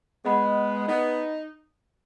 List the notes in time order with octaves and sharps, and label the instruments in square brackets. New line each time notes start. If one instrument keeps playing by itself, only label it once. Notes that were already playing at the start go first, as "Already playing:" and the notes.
[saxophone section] G#3 B3 [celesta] G#4 D#5 F#5 B5
[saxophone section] B3 D#4